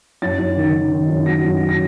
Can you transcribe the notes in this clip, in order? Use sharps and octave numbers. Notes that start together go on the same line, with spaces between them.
F#2 A6
F#2
D#3
D#3
D#3
F#2
F#3 A#6
F#2
F#3
A#6